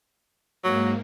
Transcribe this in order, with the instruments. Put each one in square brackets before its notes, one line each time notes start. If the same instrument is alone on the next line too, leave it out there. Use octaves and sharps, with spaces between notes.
[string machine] G#2 A#3 [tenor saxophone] F#3